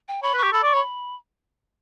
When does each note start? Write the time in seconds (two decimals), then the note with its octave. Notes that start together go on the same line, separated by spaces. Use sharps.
0.08 G5
0.23 C#5 B5
0.34 B4
0.38 C#6
0.43 G4
0.53 A4 B5
0.63 D5 C#6
0.74 C#5 B5